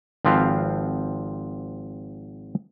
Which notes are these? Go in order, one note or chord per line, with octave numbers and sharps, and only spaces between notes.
G#1 F3 C4 B4 F5